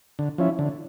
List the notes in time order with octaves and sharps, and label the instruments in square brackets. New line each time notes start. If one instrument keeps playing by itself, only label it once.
[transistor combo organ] D3
F3 C#4 E4
D3